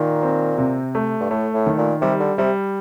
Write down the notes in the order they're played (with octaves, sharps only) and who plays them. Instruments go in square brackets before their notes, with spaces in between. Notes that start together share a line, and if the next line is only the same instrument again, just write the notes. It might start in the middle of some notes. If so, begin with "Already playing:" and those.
Already playing: [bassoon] A#2 [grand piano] D#3
[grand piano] C4
C3
A3
[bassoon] G2
[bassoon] A2 [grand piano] A3
[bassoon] A2
[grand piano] D#3
[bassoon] A#2
[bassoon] C3 [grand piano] G3
[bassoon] D3
[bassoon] C3 [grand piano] G3